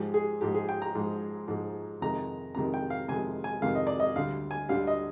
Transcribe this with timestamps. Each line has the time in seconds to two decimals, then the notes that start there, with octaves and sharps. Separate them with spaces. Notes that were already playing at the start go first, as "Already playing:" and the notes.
Already playing: G#2 F3 G#3 G4
0.14 G#4
0.41 G#2 F3 G#3 G4
0.55 G#4
0.69 G5
0.82 A#5
0.95 G#2 F3 G#3
1.48 G#2 F3 G#3
2.02 F2 C3 D#3 G#3 A#5
2.55 F2 C3 D#3 G#3 A#5
2.74 G5
2.90 F5
3.08 F2 C3 D#3 G#3 G#5
3.44 G#5
3.62 F2 C3 D#3 G#3 F5
3.75 D#5
3.87 D5
4.00 D#5
4.16 D2 D3 G3 F5
4.51 G#5
4.68 D2 D3 G3 F5
4.87 D#5